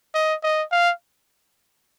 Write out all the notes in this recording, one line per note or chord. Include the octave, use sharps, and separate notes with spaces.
D#5
D#5
F5